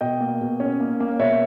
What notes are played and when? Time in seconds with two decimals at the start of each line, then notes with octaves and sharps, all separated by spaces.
0.01 B2 D#5 G5
0.20 A#3
0.41 B2
0.60 C#4
0.80 A#3
1.00 A#3
1.19 B2 C#5 E5